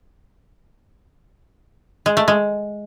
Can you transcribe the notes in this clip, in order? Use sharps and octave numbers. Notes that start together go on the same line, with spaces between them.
G#3
A3
G#3